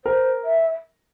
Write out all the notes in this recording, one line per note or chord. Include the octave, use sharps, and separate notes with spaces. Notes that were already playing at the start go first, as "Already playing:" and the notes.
A#4 C5
E5